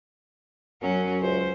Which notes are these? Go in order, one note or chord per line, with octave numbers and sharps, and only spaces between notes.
F#2 F#3 C#4 F#4
C#2 C5